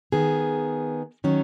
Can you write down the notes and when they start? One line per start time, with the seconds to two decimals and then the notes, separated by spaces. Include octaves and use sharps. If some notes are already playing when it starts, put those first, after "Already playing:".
0.12 D#3 B3 G#4
1.24 D#3 F#3 C#4